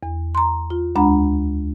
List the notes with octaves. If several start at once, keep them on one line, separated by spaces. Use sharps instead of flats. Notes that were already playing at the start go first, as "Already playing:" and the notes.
E2
A#5 C6
F4
D2 G#3 D4 F#5 A#5 B5